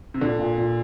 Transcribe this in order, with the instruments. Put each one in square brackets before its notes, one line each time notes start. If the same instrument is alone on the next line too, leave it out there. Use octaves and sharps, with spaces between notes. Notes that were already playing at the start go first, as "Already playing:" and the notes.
[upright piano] C3
[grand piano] A#2 [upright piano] D3
[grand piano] A#2
A#2